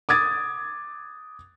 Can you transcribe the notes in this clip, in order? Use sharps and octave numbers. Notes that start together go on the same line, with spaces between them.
D6 D#6 G#6 A6